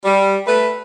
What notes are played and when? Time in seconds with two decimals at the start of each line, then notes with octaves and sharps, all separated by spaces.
0.03 G3
0.46 A3 B4